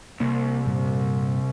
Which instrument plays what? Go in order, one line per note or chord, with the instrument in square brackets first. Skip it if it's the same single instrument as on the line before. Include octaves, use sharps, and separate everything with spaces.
[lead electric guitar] C2 [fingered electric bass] A#3
[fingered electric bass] G2 A#2 G3